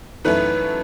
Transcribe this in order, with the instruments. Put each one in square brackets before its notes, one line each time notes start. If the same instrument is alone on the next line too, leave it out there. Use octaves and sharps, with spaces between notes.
[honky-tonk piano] F#2 E3 A3 D#4 [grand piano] B4